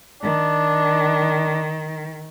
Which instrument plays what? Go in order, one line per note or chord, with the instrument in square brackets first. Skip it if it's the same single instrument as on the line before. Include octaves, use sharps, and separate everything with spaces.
[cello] D#3 [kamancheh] D4